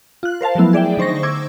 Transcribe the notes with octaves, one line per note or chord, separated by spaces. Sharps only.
F4 F#6
A#4 C5 F5 A5
F3 F#3 A3 B3 E4
G#4 D5 E5 G5
D3 D#4 C5 C#6 A#6
C#6 D6 E6 G#6